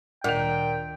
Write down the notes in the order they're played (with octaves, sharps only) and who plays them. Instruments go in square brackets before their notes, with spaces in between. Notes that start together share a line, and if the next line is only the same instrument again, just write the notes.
[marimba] D2 D#3 [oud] A#2 [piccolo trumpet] G5